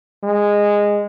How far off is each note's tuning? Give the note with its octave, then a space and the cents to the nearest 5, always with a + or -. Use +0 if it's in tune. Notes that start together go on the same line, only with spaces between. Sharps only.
G#3 -15